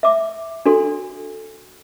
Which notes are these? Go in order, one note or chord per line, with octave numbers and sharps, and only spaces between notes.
E5 D6
D4 F#4 A4 C6